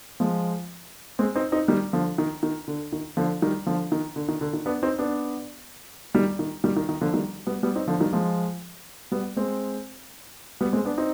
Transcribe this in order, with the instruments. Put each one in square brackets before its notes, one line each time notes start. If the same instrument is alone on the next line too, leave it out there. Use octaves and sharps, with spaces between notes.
[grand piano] F3 G#3
G#3 C4
C4 D#4
C4 D#4
D#3 G3
D3 F3
D#3
D#3
D3
D#3
D3 F3
D#3 G3
D3 F3
D#3
D3
D#3
D3
D#3
B3 D4
C4 D#4
B3 D4
D#3 G3
D#3
D#3 G3
D#3
D#3
D3 F3
D#3 G3
G3 B3
G3 B3
C4 D#4
D3 F3
D#3 G3
F3 G#3
G3 B3
G#3 C4
G3 B3
G#3 C4
B3 D4
C4 D#4